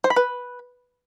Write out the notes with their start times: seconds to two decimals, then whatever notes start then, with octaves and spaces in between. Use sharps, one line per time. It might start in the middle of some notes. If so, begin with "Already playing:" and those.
0.04 C5
0.10 B5
0.16 B4